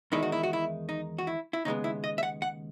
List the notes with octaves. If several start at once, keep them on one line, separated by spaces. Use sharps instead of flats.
E2 D#3 G#3 D#4 E4
F#4
E4
F#4
E4
D#4
F#4
E4
E4
D#2 C#3 G#3 B3 D#4
E4
D#5
E5
F#5
F#5